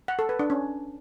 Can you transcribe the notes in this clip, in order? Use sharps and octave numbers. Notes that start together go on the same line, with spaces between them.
F#5
A4
B4
D4
C#4